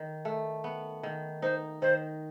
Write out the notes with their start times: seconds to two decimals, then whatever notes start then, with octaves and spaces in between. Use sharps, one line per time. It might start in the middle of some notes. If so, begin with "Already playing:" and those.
Already playing: D#3
0.25 A3
0.64 B3
1.03 D#3
1.42 D#4 C5
1.82 D#3 C5